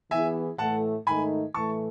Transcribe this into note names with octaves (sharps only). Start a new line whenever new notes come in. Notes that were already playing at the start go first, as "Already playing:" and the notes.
E3 B3 E4 G#4 E5 G#5
A2 E3 A3 F#5 A5
G#2 D#3 A3 D#4 G#5 B5
A2 E3 A3 A5 C#6